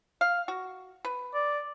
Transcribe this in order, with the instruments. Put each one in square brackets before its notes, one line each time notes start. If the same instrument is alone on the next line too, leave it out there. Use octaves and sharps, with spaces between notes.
[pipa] F5
F#4
B4
[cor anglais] D5